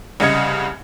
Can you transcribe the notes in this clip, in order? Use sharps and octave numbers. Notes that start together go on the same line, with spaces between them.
C2 C#3 D#5 G#6 C#7